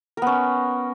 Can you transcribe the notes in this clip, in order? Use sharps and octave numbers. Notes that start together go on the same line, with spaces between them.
B3 C#4 A#4